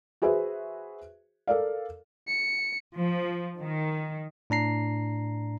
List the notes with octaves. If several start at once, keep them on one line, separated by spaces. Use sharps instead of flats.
F#4 G#4 B4 C5 E5
A4 A#4 D5 F5
C#7
F3
D#3
A2 D4 A#5 C7